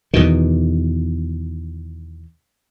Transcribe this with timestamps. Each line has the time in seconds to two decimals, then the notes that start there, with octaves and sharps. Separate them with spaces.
0.14 E2 B2 D#3